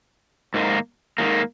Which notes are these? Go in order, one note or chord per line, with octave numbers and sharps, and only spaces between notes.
G#2 D#3 A#3
G#2 D#3 A#3